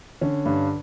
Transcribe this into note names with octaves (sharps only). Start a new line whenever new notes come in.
D3 C#4
G2